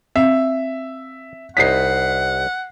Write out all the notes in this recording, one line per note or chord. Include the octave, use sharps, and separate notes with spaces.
C4 E5 F5
C2 D#4 C#5 F#5 B6 C7